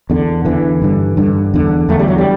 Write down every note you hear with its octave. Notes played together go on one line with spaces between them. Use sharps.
E2 D3
E2 D3 E3
G2 D3
G2 D3
E2 D3
E2 D3 A3
G3
F#3
G3